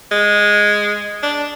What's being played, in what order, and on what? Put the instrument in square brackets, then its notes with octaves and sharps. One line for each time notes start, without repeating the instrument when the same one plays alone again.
[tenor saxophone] G#3
D4